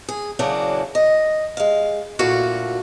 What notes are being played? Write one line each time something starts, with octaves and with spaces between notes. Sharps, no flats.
G#4
C#3 E3 F#3 A#3 D4
D#5
G#3 F5
D2 A#2 A3 E4 F#4 F5